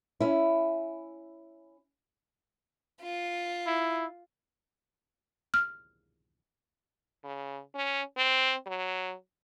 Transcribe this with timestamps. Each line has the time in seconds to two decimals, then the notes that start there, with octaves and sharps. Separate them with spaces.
0.20 C#4 E4
3.01 F4
3.67 E4
5.54 F6
7.24 C#3
7.75 C#4
8.17 C4
8.67 F#3